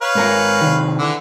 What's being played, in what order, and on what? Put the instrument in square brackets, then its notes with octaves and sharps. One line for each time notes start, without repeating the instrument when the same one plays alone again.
[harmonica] B4 C#5 F5
[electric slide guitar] G#2 A#4 A#5
C3 D#3
[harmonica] D3 E3